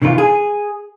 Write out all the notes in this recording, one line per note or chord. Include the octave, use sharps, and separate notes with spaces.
C3 D#3 E3 F4
G#4